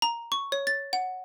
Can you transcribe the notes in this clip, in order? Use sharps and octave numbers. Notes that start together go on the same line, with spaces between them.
A#5
C#6
C#5
A6
F#5